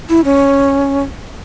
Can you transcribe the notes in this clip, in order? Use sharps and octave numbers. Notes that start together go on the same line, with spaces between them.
E4
C#4